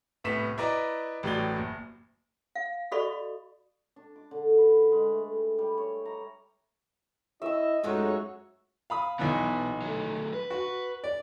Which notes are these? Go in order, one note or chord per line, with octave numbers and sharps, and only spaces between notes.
C2 A2 B3 B6 E7
E4 B4 D5 D#5 A#5 D6
A1 A2 F#3 D5 G7
F#1
F5
F#4 A4 D5 D#5 B5 C#6
D4
D6
D3
B4
G#3
A3
G3
G3
C#5
A#5
E4 D#5 E5 E6
F#2 G#3 A3 C#4 D#4 F4 F#4 C#5
F5 B5 D#6
B1 B2 E3 B3
F#3 A3
B4
F#4
D5